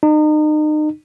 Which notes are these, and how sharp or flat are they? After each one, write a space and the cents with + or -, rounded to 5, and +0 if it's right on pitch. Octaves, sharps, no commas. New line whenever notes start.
D#4 -35